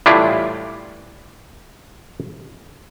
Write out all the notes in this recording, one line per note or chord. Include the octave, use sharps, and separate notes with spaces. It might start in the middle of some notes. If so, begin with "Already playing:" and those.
A2 E3 G3 D4 E4 F4